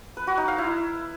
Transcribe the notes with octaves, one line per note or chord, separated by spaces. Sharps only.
B4
F#4
D#4
F5
E4